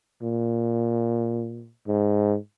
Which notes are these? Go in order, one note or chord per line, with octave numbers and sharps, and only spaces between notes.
A#2
G#2